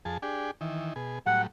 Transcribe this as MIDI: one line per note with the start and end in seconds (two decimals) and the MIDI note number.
0.05 0.18 41
0.05 0.18 68
0.05 0.18 81
0.22 0.51 62
0.22 0.51 67
0.22 0.51 68
0.61 0.94 51
0.61 0.94 52
0.96 1.19 47
0.96 1.19 68
1.26 1.47 45
1.26 1.47 54
1.26 1.47 55
1.26 1.42 78